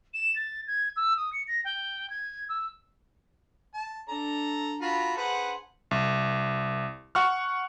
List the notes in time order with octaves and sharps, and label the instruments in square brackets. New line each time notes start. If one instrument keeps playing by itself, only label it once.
[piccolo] E7
A6
G#6
E6
D#6
C#7
A#6
G5
G#6
E6
[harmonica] A5
[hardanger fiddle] D4 [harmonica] A4 A#5
[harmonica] F4 F#4 B5 [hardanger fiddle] A4 A#5
[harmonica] G#4 B4 C5 [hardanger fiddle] F#5
[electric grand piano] C2
F#5 C#6 F6